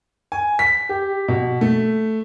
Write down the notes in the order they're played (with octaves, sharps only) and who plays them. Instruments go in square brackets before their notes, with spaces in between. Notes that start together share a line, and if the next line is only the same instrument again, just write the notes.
[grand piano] G#5
B6
G4
B2
A3